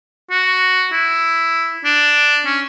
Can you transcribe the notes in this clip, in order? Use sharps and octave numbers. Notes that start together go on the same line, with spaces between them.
F#4
E4
D4
C#4